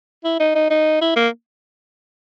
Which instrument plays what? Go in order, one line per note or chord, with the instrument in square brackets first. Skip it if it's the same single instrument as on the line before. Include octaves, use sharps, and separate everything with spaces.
[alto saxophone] E4
D#4
D#4
D#4
E4
A#3